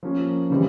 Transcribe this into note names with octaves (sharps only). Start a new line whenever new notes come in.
F3 A#3 C#4
C#3 E3 G3 C4